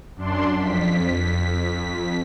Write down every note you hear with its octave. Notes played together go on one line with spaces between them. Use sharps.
F#2 D4 C6
F2 B6